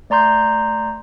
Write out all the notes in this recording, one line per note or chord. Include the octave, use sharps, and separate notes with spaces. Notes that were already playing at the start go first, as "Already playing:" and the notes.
A3 D5 A#5 C6 G6